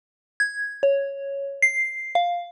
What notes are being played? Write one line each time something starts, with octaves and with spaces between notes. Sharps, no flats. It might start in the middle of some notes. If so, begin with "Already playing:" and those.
G#6
C#5
C7
F5